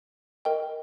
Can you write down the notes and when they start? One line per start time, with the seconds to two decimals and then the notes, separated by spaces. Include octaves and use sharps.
0.45 A#4 D#5 G5